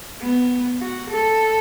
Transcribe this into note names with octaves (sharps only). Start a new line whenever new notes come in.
B3
F#4
A4